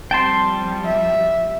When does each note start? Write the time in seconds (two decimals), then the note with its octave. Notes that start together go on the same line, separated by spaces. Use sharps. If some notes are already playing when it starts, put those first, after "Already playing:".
0.11 F3 G3 C4 G5 A5 C6
0.85 E5